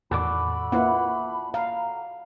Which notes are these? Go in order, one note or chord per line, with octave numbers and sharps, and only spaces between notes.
E2 A2 D#3 F#4 A4 D5 B5
A#3 E4 F4 B4 F#5
F5 A#5